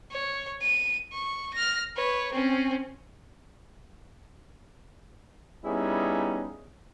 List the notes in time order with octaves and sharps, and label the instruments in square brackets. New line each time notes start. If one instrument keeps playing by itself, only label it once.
[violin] C#5
D#7
C#6
F6 A#6
B4 C#5
C4 C#4
[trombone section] G3 B3 C#4 D#4 E4 G#4